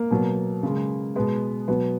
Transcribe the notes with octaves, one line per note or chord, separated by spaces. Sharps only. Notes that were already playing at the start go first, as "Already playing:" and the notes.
Already playing: A#3
B2 F#3
C#3 G#3
B2 G#3 B3
B2 F#3 B3